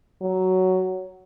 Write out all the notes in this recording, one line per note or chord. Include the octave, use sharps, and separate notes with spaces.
F#3